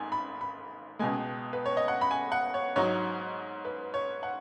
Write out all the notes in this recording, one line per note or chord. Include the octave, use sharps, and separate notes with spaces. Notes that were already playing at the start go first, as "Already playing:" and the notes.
Already playing: G#1 G#2 G#5
B5
B5
C#2 B2 G#3 G#5
B4
C#5
D#5
F#5
B5
G#5
F#5
C#5
G#2 F#3 D#4 C#5
B4
C#5
F#5